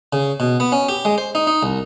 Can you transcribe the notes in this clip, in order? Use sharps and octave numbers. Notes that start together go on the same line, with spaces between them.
C#3
B2
B3
C#4
G4
G#3
C5
D#4
D#4
C2